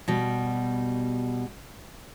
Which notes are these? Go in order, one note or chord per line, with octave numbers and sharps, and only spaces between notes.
B2 G3